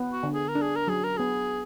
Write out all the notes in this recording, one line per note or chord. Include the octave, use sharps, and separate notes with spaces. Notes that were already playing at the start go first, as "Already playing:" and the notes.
Already playing: B3
F#4
D3
G#4
A#4
D4
G#4
A#4
F#3 G#4
A#4
B3 G#4